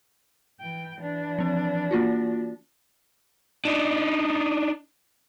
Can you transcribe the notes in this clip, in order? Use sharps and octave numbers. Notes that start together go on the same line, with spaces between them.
E3 G5
E3 D4
F3 C4
A#3 F4 F#4
D4 D#4